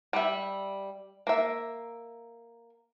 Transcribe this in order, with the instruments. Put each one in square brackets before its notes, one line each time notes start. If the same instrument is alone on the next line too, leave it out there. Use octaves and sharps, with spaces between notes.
[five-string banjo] G3 E5
A#3 E5